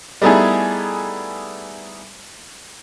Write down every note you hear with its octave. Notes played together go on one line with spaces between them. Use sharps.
G3 A3 B3 D#4 E4 G#4